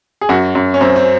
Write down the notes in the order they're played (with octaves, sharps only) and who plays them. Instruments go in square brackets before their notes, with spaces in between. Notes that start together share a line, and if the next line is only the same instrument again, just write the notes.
[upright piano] G#4
F#2 F#4
F#2
C#4
F#2 C4
C4